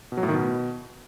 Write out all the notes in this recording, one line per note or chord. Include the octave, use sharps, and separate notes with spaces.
B2
F#3
A2
D#3
B2